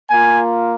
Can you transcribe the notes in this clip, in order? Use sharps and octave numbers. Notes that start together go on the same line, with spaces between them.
A#3 F4 G#5